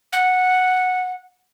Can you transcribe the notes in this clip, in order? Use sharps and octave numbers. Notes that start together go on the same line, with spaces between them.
F#5